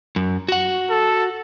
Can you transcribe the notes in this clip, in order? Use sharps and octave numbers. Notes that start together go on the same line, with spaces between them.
F#2
F#4 F#5
A4